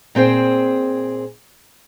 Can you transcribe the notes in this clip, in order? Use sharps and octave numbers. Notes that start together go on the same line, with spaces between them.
A#2 C4 G#4 C5 G5